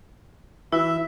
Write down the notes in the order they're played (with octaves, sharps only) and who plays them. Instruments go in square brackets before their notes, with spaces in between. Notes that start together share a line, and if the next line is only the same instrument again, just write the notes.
[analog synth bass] E3 [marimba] E4 F#4 [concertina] E5